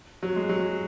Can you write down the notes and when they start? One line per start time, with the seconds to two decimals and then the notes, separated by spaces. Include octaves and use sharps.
0.23 F#3
0.36 G#3
0.49 F#3